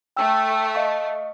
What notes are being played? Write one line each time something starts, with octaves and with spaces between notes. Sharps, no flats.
A3 G5 E6
D#5 F5 C#6